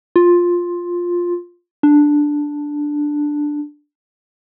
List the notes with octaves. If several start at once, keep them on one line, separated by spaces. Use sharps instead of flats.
F4
D4